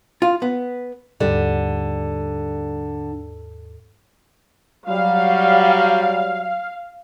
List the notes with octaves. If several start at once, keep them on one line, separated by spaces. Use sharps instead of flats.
F4
B3
D#2 G#2 D3 G3 G4 D5
F#3 G3 F5